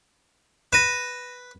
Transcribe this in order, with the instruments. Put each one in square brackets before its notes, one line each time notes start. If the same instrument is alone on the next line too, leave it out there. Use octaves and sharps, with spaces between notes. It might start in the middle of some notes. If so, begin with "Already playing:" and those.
[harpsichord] B4 [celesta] A#6 D#7 E7